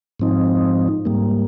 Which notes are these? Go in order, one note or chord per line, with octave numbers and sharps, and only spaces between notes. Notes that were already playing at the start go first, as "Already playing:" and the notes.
G#2 F3 C4 D#4
G#2 G3 A#3